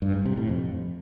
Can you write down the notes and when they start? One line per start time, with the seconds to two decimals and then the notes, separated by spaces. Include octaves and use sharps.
0.02 G2
0.14 G#2
0.25 C3
0.37 A2
0.49 F2